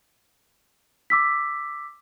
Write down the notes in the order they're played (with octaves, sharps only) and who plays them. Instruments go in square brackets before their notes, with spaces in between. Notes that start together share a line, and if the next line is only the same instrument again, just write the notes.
[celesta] D6 E6 B6